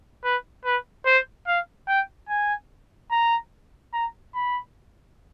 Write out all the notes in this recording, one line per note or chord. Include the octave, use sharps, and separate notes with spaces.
B4
B4
C5
F5
G5
G#5
A#5
A#5
B5